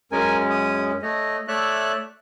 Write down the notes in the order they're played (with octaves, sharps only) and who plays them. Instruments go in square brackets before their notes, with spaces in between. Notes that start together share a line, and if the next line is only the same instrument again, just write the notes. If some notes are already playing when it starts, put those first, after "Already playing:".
[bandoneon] F#2 G#3 C#4 [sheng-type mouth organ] A#4 G#5
[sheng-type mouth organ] D#6
[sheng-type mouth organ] A3 D#5 [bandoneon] C#5
[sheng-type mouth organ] A3 F#6 [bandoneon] C#5 D5 E5